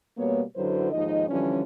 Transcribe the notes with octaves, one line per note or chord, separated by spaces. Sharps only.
B2 G3 A#3 B3 C#5
F#2 D3 F#3 E4 B4 C5
D#2 G#2 F3 D#4 D#5
D3 E3 F3 G3 C#4